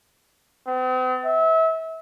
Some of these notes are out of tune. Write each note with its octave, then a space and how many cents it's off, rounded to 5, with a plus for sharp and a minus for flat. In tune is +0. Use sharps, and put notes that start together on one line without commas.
C4 -45
E5 -30